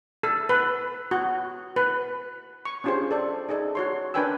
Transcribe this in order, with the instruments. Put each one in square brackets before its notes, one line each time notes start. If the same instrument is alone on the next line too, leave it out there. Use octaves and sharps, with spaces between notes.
[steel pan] A4
B4
F#4
B4
C#6
C#4 D4 F4 G4 G#4 C5
A4 D5
D#4 G#4 A4 D5
F#4 C#5 C6
D4 A#4 B4 G5 G#5 E6